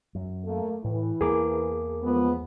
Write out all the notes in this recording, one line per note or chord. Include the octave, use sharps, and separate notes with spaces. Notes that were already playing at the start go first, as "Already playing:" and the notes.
F#2
A3 A#3
A2 E3
E2 A#3 G#4 A#4 D6
F3 G#3 B3